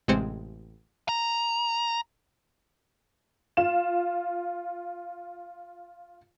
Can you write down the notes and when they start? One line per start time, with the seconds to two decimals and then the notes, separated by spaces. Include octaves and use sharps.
0.08 A1 C3 G#3 C4 C5 C#7
1.09 A#5
3.57 F4 E7